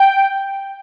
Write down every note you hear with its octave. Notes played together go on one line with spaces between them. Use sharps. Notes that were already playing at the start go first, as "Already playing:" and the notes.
Already playing: G5